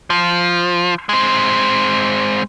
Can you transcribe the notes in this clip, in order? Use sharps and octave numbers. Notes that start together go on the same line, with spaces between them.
F3
G#3 C4